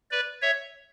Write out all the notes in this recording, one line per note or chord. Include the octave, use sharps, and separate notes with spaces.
B4 D5
C#5 E5